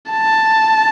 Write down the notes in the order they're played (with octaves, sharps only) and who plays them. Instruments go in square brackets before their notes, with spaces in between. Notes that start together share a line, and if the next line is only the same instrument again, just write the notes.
[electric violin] A5